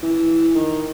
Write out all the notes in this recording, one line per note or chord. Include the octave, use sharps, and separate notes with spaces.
E3
D#3